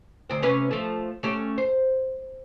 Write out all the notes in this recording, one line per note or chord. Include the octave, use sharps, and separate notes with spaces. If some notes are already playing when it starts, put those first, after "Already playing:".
D2 C4
C3 C#4 B4
F3 A3
A3 C#4 G4
C5